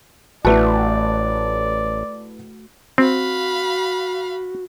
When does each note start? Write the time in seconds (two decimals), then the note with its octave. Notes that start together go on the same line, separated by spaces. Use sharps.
0.45 A1 A3 E4 F#4 B4 D5 A5
2.98 C4 F#4 F5 B5